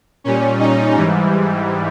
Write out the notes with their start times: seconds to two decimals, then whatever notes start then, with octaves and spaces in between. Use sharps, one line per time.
0.24 A#2 G3 C#4
0.59 D#4
0.95 G#2 E3 G3